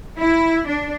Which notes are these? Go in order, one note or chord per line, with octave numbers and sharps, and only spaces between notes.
E4
D4